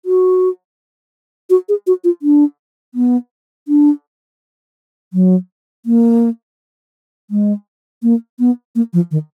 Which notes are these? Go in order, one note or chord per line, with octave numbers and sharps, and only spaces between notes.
F#4
F#4
G#4
F#4
F4
D4
B3
D4
F#3
A#3
G#3
A#3
B3
A#3
F3
D#3